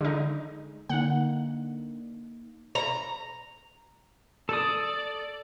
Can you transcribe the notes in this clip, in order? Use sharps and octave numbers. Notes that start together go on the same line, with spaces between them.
D3 G#3 D#4
D3 A#3 D#4 F#5
A#5
A4 D5 D#6